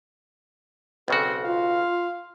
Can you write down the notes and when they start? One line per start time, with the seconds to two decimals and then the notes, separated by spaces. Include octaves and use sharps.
1.08 B1 C#3 C4 F#4 A4
1.44 F4 F5